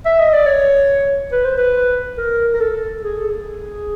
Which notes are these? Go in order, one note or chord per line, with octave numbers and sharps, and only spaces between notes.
E5
D#5
D5
C#5
B4
C5
B4
A#4
A#4
A4
G#4
A4
G#4